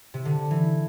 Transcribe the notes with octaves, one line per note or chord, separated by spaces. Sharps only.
C3
D3
E3